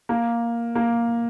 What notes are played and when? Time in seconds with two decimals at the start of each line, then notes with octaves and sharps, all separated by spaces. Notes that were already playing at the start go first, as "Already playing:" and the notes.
0.09 A#3
0.75 A#3